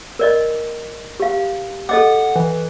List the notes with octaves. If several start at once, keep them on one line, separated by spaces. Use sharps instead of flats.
A#4 D5 D#5
G4 F5
A4 D#5 F#5 D6
E3